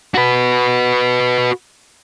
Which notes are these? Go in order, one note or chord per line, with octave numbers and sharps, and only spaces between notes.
F#4 B4